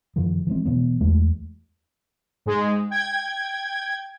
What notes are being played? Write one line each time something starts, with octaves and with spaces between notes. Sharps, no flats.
F#2 C3 D#3 F3
E3 G#3 C4
B2 E3 B3
E2 G#3 A3
G#2 G#3
G5 G#6